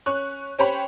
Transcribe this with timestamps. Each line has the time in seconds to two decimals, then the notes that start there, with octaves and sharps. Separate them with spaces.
0.06 C#4 C#6 F#6
0.59 C#4 G4 C5 C#5 G5 B5